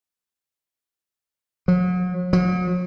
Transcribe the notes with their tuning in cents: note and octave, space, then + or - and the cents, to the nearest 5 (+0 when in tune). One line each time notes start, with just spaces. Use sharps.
F#3 -40
F#3 -40